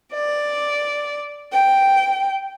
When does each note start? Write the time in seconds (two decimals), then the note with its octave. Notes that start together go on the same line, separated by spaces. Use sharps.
0.13 D5
1.52 G5